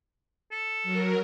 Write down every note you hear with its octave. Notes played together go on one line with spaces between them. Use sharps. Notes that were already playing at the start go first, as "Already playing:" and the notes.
A4
F#3 A#4